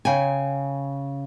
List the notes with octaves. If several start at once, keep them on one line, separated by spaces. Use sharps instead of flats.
C#3 G5 G#5